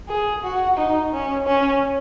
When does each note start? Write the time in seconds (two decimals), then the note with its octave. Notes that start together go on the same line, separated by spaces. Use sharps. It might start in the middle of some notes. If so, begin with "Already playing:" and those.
0.09 G#4
0.43 F#4
0.78 D#4
1.12 C#4
1.47 C#4